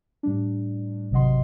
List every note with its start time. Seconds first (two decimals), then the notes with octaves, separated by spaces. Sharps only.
0.23 A2 G3 D4
1.11 G#1 C3 F#3 D#5 F#5 C6